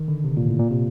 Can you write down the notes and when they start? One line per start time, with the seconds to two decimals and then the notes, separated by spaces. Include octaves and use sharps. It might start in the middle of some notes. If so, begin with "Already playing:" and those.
Already playing: D#3
0.08 D3
0.24 C3
0.37 A#2
0.48 A2
0.59 A#2
0.71 C3